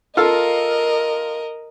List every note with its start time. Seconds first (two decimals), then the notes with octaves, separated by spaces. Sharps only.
0.17 F4 A4 A#4 D#5 F5